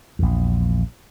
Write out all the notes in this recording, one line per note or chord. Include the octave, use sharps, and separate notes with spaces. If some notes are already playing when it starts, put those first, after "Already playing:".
A#1 E2